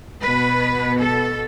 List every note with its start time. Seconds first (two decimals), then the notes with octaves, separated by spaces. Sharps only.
0.23 B2 B3 B4
1.01 A4